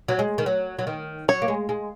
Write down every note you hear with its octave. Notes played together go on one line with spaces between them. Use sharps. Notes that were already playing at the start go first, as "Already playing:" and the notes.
F#3
G#3
D#3
F#3
F#3
D#3
F#3 C#5
A#3
G#3
G#3